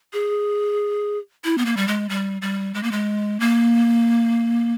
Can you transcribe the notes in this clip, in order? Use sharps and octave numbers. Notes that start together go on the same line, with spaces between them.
G#4
E4
B3
A#3
G3
G#3
G3
G3
G#3
A#3
G#3
A#3